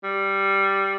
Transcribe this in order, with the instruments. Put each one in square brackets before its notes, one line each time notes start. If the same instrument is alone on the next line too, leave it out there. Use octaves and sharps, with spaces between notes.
[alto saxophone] G3